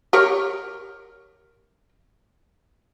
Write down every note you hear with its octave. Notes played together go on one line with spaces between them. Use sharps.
G4 A#4 C#5